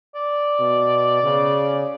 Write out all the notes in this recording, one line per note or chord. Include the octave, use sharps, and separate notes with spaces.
D5
B2
C#3